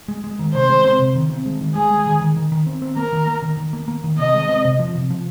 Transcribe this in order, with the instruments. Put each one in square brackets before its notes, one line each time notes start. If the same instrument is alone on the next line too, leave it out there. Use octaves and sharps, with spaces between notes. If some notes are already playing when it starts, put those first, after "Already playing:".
[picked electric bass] G#3
G#3
D#3
[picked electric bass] C3 [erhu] C5
[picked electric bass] G#3
C4
C3
D#3
C4
G#3
D#3
[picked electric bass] G#3 [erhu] G#4
[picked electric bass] G#3
D#3
D#3
D#3
D#3
C4
C4
[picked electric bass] A#3 [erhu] A#4
[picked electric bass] D#3
A#3
D#3
D#3
A#3
A#3
D#3
[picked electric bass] C3 [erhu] D#5
[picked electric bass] G#3
C4
C3
F3
C3
F3